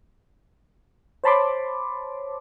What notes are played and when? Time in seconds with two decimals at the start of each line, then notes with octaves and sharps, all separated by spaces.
1.24 C5 C#5 A5 B5 C6 D6